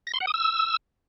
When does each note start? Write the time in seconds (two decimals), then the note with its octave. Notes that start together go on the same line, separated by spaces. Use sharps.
0.07 A#6
0.14 C6
0.20 F#5
0.27 D#6
0.34 E6